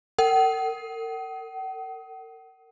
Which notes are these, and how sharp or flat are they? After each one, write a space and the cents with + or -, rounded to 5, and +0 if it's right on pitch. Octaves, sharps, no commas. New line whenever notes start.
A#4 -45 F#5 +45